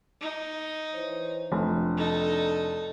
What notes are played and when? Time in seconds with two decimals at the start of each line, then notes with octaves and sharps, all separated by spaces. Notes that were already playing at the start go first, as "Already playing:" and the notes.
0.21 D#4
0.94 E3 C5 C#5
1.52 F1 D4
1.97 D#4 A4